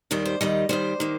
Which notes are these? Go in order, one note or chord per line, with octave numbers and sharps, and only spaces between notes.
D#2 D#3 G3 A#4
C5
D#2 D#3 G3 D#5
D#2 D#3 G3 C5
D#3 A#3